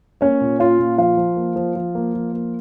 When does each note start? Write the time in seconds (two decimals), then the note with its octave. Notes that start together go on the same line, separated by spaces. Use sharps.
0.21 A#3 C#4 C#5
0.41 A#2
0.59 C#4 F4 F5
0.79 A#2
0.98 F3 F4 F5
1.17 F3
1.36 A#3
1.56 F3
1.76 F3
1.95 A#3
2.14 F3
2.33 A#3